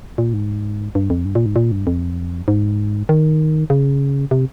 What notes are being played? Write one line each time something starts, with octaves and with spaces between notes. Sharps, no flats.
A#2
G#2
G2
F2
G2
A#2
G#2
A#2
G2
F2
G#2
D#3
C#3
C3